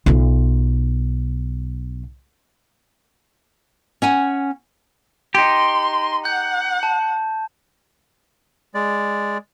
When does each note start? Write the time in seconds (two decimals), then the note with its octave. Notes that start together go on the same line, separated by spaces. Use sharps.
0.06 B1 F4
4.02 C#4 F#5 G#5
5.35 D#4 G4 C6
6.25 F#5 G6
6.83 A5
8.74 G#3 D5